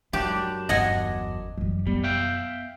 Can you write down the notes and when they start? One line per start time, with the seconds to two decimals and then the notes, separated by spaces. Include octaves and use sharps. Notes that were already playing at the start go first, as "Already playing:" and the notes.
0.13 F#2 G#3 D4 G4
0.69 G1 E2 D#5 F#5 G#5
1.58 F#2 E3 G3
1.87 G3 B3
2.04 E5 F5 G5